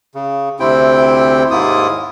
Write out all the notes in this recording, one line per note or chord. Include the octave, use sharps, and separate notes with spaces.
C#3
D2 C3 C4 E4 G5
D#2 G#2 A#3 E4 F4 D#6